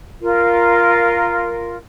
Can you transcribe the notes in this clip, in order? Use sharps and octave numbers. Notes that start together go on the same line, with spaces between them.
F4 A#4